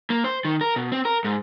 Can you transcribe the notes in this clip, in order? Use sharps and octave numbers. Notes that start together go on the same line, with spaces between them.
A#3
C5
D#3
A#4
B2
C4
A#4
G#2